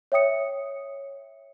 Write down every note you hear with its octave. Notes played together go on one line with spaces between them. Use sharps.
C#5 E5 G5 D#6 C#7